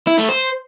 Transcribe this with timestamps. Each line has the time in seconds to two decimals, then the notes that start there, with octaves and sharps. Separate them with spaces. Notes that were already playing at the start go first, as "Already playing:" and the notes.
0.07 E4
0.18 A3
0.29 C5